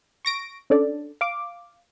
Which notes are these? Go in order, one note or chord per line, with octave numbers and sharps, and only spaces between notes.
C#6 A#6 D7
C#4 D4 A4 D5
F5 D6